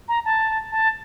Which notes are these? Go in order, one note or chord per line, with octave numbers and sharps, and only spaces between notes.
A#5
A5
A5